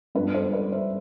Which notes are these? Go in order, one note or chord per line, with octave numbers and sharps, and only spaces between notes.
G2 F3 B3 D4 B4
A4 C5
B4 D5
C5 E5